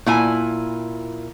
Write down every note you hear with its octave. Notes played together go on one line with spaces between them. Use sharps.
A#2 E4 G#5